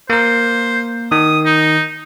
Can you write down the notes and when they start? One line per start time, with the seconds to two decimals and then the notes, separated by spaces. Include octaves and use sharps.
0.10 A#3 A#4 C5
1.12 D#3 D#6
1.45 D#4